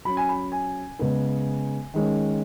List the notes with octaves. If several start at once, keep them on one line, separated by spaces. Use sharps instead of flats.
F#3 C#4 B5
G#5
B5
G#5
C#3 G#3 B3
D#3 G#3 C#4